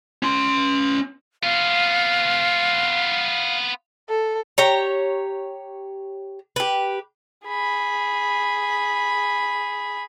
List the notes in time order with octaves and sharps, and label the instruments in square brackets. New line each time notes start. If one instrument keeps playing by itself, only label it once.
[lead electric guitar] C#4 C6
[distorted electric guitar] B3 F4 [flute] F5
[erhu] A4
[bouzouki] G4 C#5 A#5
G4 B4
[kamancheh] G#4 B5